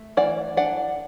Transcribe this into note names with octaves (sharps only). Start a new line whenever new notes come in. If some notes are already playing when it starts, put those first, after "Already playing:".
Already playing: A3
E3 D5 F#5
D4 D5 F#5